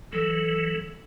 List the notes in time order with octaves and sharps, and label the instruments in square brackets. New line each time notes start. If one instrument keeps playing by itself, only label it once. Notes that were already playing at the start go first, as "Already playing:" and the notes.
[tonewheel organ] E3 F#3 [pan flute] A4